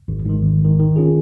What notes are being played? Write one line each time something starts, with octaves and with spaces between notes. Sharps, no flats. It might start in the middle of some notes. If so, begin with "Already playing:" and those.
G#1
G#2 D#3
G#1
G#2 D#3
D#3
C#4 F4 G#4